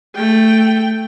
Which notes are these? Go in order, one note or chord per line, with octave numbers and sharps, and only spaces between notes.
A3 G5